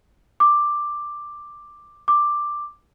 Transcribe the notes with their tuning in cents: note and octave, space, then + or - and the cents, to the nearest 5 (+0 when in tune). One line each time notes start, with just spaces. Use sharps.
D6 +5
D6 +5